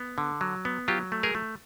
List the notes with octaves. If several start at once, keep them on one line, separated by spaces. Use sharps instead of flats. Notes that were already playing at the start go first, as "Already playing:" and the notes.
Already playing: B3
D3
F#3
B3
F#3 F4 G4
A3
G#4 A#4
A3